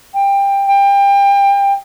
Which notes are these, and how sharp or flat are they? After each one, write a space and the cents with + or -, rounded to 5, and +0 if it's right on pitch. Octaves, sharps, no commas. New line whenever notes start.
G5 +20
G5 +30